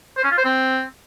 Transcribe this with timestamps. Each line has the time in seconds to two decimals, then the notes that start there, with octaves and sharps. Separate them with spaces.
0.17 C5
0.24 C#4
0.31 F4
0.38 C5
0.45 C4